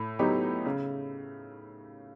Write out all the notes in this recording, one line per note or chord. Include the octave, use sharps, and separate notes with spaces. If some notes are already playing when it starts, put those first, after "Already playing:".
Already playing: A2
F#3 B3 D#4 G4
C#3